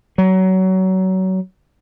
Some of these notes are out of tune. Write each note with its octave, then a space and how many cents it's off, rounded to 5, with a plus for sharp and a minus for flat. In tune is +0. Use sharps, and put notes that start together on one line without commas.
F#3 +25